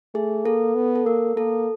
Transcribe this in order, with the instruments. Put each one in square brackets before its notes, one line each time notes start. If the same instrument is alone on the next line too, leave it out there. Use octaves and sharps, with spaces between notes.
[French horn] A3 [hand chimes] G#4
[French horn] A#3 [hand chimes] A4
[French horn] B3
[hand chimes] A4
[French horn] A#3 [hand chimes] A#4
[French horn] A#3 [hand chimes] A4